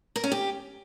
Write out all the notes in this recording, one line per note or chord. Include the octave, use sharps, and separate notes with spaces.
A#4
C#4
G4